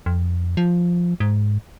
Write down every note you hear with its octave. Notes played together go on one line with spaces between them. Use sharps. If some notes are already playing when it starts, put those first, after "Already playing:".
F2
F3
G#2